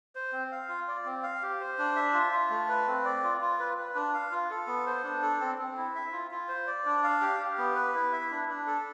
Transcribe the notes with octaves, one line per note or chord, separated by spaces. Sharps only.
C5
C4
F5
F4
D5
C4
F5
G4
C5
D4
E5
F4
F4
A3
B4
C4
D5
F4
F4
B4
B4
D4
F5
F4
A4
B3
C5
D4
A4
C4
C4
E4
E5
F4
F4
C5
D5
D4
F5
G4
G4
B3
B4
E4
E5
D4
D4
A4